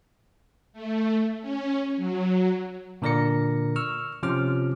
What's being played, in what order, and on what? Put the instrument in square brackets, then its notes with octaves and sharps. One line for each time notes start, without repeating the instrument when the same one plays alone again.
[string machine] A3
C#4
F#3
[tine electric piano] A#2 D3 A#4 D5 A#6 C#7
C#6 E6 F6
C3 F3 C#4 C5 D6 F6